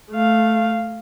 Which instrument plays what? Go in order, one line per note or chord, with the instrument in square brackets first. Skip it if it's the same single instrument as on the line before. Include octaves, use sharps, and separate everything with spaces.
[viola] A3 F5